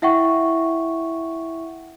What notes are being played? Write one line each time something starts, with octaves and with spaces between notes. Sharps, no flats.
E4 E5 F#5 G5 C#6